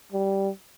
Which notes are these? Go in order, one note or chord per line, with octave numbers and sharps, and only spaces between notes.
G3